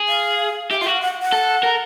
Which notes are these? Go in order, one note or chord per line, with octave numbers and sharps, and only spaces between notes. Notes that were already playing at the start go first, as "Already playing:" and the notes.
Already playing: G#4
F5
G4 E5
F4 E5
F#4 F5
F#5
F#5
A4
A#4